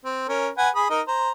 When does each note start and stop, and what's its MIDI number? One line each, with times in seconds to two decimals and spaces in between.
0.05 0.25 60
0.29 0.49 61
0.29 0.49 70
0.58 0.69 71
0.58 0.69 78
0.58 0.69 80
0.75 0.90 68
0.75 0.90 83
0.75 0.90 87
0.90 1.01 63
0.90 1.01 70
0.90 1.01 75
1.08 1.31 72
1.08 1.31 82